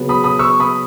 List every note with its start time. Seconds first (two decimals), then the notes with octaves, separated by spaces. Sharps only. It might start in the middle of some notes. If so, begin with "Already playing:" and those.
Already playing: C#3 F#3 B3
0.09 B5 D#6
0.24 B5 D#6
0.39 C#6 E6
0.60 B5 D#6